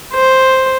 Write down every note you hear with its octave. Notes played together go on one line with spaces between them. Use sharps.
C5